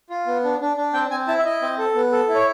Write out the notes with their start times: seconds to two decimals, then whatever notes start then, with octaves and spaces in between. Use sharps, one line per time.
0.10 F4
0.27 B3
0.44 D4
0.61 D4
0.77 D4
0.94 C4 G5
1.11 C4 G#5
1.28 E4 A5
1.38 E5
1.45 E4 D#5
1.62 C4
1.78 A4
1.95 B3
2.12 A4
2.29 E4
2.34 C#5